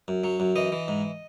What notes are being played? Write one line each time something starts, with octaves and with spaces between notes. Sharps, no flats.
F#2
F#3
F#2
E3 D#5
E3
G#2